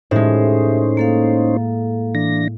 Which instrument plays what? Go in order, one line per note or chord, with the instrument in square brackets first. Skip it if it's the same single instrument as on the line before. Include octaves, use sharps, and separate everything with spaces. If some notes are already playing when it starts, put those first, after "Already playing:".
[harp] A2 G#3 [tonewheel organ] C#4 D#4 C5 [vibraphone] G4 E5
[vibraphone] A#3 A4 F5
[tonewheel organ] E3 D4 A#6